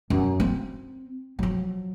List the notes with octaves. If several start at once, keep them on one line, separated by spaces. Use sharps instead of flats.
F#2
C4
F3 F#3